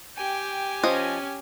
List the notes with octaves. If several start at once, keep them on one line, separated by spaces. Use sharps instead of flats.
G4 G5 G#5
F3 C#4 D#5